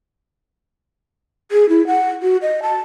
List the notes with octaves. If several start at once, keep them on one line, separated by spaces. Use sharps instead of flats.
G#4
E4
F#5
F#4
D#5
A5